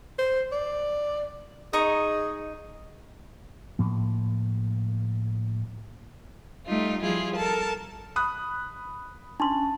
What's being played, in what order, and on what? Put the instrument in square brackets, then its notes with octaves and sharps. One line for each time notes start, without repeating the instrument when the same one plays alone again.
[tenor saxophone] C5
D5
[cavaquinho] D#4 D#5 C#6 [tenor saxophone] G#4
[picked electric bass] A2 F3 A#3
[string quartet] G3 A3 D#4 F4
F3 G3 E4 F4 G#4
A4 A#4 A5
[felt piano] B5 D#6 F#6
[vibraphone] C#4 [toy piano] D4 C6 [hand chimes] A5